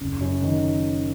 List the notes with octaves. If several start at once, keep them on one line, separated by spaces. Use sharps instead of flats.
F#1
F#2
D#3